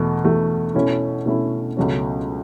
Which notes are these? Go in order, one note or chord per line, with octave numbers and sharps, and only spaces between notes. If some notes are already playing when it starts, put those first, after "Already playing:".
Already playing: E2 B2 A3
E2 B2 A3
B2 A3 C#4 E4
B2 A3 C#4 E4
C#2 B2 F#3 A3 C#4